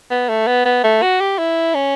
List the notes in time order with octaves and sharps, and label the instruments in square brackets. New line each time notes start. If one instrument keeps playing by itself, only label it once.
[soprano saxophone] B3
A3
B3
B3
A3
F#4
G4
E4
C#4